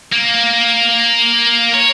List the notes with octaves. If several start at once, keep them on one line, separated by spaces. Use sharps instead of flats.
A#3
C#5